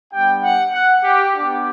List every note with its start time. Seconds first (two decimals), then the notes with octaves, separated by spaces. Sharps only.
0.12 G3 B3 D4 G4 G5
0.43 F#5
0.74 F#5
1.04 G4
1.35 B3 D4 G4